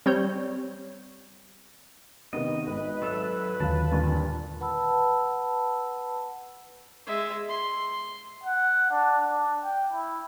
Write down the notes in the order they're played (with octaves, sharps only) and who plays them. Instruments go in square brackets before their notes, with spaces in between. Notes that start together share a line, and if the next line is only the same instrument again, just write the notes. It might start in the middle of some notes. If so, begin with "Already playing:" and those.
[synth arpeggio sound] G3 C4 C#5 G6
[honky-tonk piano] C3 D#3 B3 [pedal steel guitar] D#5
[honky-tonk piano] G#1 [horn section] B4
[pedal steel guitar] F#3 A4 E5
[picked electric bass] D#2 D3 D#3 [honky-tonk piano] F#3 F4 [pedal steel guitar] A5
[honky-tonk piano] G2 A#2
[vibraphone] B4 F#5 A5 B5 E6
[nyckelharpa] G#3 E5
C6
[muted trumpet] F#5
D4
D4
G5
E4